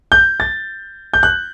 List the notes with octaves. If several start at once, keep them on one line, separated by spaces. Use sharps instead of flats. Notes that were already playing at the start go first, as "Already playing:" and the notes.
G6
A6
G6
F#6